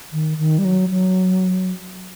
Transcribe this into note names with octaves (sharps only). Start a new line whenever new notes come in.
D#3
D#3
G3
F#3
F#3